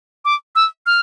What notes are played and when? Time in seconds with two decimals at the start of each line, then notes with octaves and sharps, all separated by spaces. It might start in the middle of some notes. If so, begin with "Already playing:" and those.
0.25 D6
0.55 E6
0.86 F6